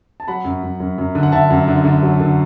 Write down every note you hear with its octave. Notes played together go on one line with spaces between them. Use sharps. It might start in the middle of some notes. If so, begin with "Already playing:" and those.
A5
F#3 F#5 B5
F#2
F#2
F#2
F#2
D3
F#5
D3 E5 A5
F#2
D3
D3
F#3
D3